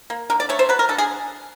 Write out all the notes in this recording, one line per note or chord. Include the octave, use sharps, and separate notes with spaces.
A#3
D3 A#4
D5
A3 C#5
C5
F#3 B4
A#4
D3 A4
G#4